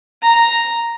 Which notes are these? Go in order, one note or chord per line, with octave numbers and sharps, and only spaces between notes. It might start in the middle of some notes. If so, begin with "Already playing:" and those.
A#5